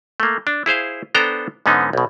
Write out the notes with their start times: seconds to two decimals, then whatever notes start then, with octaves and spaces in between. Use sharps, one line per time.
0.20 A3 A#3
0.47 D4
0.66 E4 G#4 C5 F5
1.15 B3 D4 A4 C5 G5 A#5
1.66 G#2 D3 B3 C#4 D#4
1.93 B1 B2